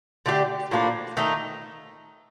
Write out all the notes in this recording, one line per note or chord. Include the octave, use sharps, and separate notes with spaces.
D3 A3 D4 G4
A2 F3 A#3 D4
D#3 A3 D#4